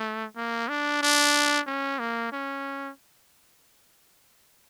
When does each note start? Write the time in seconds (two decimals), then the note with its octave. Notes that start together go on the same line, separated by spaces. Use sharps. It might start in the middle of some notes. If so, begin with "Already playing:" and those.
Already playing: A3
0.36 A#3
0.69 D4
1.02 D4
1.67 C#4
1.99 A#3
2.32 C#4